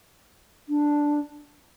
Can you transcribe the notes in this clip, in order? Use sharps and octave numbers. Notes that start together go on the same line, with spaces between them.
D4